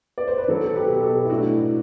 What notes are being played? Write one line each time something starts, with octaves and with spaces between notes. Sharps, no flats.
D5
C5
B4
F#3 F#4 A4
A4
G4 B4
B2 G4
F#4 A4
E4
A2 D4 F#4